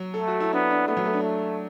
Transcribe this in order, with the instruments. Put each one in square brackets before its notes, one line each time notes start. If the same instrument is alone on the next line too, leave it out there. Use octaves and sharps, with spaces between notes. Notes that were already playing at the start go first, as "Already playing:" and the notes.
Already playing: [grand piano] F#3
[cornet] A3 [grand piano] A4
[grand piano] F#4
E4
[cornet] B3 [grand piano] D4
[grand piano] D4
[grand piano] A3 [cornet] B3
[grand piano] F#3
A3
D4
[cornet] A3